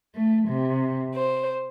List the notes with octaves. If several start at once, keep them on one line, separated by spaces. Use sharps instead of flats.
A3
C3
C5